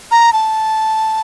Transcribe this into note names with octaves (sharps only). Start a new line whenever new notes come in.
A#5
A5